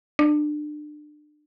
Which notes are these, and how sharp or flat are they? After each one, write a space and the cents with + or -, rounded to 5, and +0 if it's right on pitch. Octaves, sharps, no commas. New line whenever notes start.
D4 +30